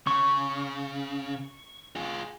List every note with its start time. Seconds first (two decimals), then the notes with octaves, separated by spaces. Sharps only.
0.07 C#3 C#6
1.96 F4 G#4